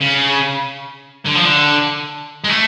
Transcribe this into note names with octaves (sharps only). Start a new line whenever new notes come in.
C#3
D3
F3
D3
G#3
A3